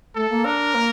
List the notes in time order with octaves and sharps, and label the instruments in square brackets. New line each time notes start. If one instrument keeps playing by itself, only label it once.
[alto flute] A3 [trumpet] A4
[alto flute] A#3
[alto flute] D4 [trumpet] A#4
[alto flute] A#3